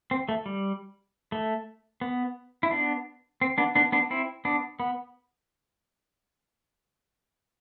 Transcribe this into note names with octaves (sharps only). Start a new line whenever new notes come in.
C4
A3
G3
A3
B3
E4
B3 D4
C4
B3 D4
B3 D4
B3 D4
C4 E4
B3 D4
B3